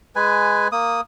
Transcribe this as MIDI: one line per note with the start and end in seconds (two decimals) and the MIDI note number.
0.16 0.68 56
0.16 0.68 71
0.16 0.68 80
0.72 1.01 58
0.72 1.01 87